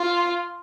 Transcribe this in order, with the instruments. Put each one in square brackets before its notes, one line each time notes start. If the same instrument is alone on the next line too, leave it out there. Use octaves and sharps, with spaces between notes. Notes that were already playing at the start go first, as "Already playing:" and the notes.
Already playing: [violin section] F4